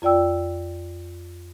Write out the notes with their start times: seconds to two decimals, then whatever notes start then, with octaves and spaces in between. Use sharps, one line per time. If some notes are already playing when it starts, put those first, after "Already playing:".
0.02 F2 F4 D5 G5 E6